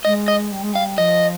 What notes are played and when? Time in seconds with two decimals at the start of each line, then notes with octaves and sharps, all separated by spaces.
0.05 G#3 D#5
0.28 D#5
0.52 G3
0.63 G#3
0.73 G3 F5
0.98 F3 D#5